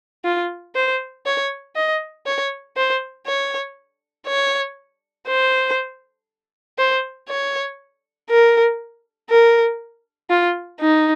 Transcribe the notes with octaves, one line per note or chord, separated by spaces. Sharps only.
F4
C5
C#5
D#5
C#5
C5
C#5
C#5
C5
C5
C#5
A#4
A#4
F4
D#4